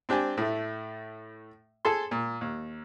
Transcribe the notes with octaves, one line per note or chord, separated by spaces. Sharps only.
C4 D4 G4 D5 G#5
A2 A3
G#4 A4 A5 C6
A#2
D#2